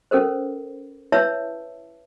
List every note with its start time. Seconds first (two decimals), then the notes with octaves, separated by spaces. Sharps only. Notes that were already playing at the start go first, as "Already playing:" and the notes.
0.11 C#4 A4 A#4 C5
1.12 E4 B4 C#5 E5 A5 E6